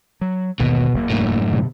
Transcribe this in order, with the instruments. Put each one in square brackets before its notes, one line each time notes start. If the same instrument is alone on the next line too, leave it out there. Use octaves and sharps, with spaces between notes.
[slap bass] F#3
[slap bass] G#1 D#2 D3 [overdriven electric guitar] B2
[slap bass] F#1 E2 A#3
[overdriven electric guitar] F#2 A2
[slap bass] B2 D3